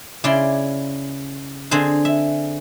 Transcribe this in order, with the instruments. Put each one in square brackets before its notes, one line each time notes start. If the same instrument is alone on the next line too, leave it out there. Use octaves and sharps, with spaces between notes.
[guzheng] C#3 E4 D5 C6
D3 C4 G#4 C5
E5